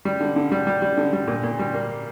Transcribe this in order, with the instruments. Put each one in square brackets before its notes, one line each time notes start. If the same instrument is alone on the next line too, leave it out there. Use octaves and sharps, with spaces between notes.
[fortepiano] G3
D3
D3
G3
G3
G3
D3
G3
A#2
A#2
G3
A#3